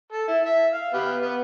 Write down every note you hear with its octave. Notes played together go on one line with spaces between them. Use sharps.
A4
E4
E5
F5
B3 G4
B3